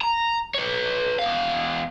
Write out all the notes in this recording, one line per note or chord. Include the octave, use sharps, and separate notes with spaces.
A#5
B4 C#5
E2 F5